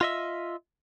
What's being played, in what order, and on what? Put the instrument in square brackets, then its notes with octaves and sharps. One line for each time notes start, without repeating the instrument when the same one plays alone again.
[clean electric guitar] F4 D#5 E5